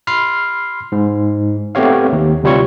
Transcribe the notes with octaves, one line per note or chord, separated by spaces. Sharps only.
B5 C6 F6 C7
G#2
A3 B3 C4 G4 C#5 F5
D#2
D2 C3 G3 F4 C#5 C#6